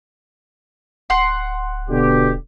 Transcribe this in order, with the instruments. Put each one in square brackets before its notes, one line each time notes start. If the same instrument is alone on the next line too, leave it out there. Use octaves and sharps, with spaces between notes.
[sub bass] D1 [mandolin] F#5 C6
[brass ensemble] B2 D3 G4